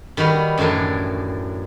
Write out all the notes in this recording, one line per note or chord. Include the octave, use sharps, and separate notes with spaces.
D#3 G3 F#4 B4
F#2 A2 E3 D4